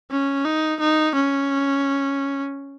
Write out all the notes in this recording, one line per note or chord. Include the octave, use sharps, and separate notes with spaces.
C#4
D#4
D#4
C#4